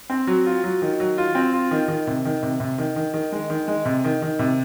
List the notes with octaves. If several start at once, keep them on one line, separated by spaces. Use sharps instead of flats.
C4
F#3
F4
F#3
D#3
F#3
F4
C4
F4
D#3
D#3
C3
D#3
C3
C3
D#3
D#3
D#3
G#3
D#3
G#3
C3
D#3
D#3
C3